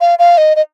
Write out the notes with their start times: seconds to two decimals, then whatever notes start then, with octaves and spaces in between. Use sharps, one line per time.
0.01 F5
0.19 F5
0.38 D#5
0.56 D#5